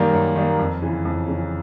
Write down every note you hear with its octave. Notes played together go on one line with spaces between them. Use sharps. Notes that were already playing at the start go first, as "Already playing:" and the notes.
Already playing: F#2 D#3 G3 A#3
F#2
D#3 G3 A#3
F2
C#3 E3
F2
C#3 E3